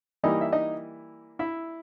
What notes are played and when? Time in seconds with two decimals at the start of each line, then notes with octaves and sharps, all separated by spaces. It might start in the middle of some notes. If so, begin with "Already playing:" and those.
0.23 E3 G3 A#3 D#4 E4 D#5
0.41 E5
0.53 D#4 D#5
1.39 E4 E5